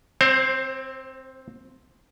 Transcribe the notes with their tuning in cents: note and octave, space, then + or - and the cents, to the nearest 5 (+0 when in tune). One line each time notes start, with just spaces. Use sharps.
C4 +0 C5 +35